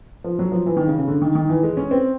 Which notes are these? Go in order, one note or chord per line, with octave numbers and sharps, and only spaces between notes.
F3
F#3
F3
E3
D#3
C#3
C#3
D3
D#3
D#3
E3
G#3
C#4
C4